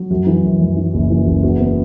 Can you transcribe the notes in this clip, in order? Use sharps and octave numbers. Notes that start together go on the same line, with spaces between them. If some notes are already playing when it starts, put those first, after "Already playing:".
Already playing: F#3
F#2 F#4
E3
F#2
F#2
E3
F#1
E3
F#1
E2 F#4
B3